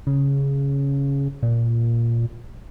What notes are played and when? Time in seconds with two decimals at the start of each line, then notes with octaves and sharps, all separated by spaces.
0.07 C#3
1.43 A#2